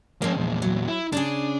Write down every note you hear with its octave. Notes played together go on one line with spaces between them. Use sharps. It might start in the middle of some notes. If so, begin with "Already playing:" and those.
F3 G#3 A#3 C#4
E2 A#2
F#3
E4
C#3 C#4 D4 G#4